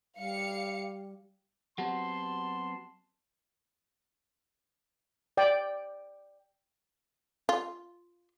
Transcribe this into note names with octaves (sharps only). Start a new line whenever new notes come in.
G3 F5 C#7
F#3 B3 C4 F#4 G4 F#5 A5 C6
D5 G5
F4